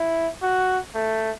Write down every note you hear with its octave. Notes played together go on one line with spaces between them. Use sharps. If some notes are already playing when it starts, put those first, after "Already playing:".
Already playing: E4
F#4
A3